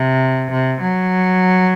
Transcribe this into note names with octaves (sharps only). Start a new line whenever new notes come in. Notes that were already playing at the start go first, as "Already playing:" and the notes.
Already playing: C3
C3
F#3